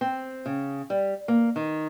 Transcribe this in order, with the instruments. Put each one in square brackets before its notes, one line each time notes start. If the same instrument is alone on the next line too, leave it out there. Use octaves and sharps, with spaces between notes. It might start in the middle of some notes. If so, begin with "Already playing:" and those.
[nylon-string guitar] C4
C#3
G3
A#3
D#3